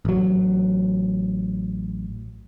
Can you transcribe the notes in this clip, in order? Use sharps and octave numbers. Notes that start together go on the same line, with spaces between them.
A1 F#3